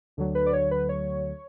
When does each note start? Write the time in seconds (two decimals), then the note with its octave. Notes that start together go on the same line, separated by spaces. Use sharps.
0.17 D2 D3 F#3
0.35 B4
0.46 D5
0.53 C#5
0.71 B4
0.89 C#5